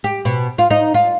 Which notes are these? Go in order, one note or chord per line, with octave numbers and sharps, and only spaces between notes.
G4
B2
F4
D#4
F4